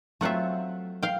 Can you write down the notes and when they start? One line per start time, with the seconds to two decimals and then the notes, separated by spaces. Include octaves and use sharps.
0.21 F#3 A3 C4 F4 E5 F#5
1.03 F5 G5